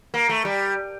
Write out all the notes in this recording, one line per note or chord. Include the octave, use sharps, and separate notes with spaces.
A#3
A3
G3